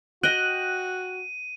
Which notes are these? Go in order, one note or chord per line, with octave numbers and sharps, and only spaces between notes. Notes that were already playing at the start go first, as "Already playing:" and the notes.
F#4 D#5 G5 F#6 D#7